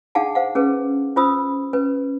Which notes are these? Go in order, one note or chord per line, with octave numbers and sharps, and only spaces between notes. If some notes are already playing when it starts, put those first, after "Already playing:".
D4 D#4 G#4 F5 F#5 A5
C5 F5 F#5
C#4 G#4 B4
C#4 F4 C5 B5 D#6 E6
C#4 B4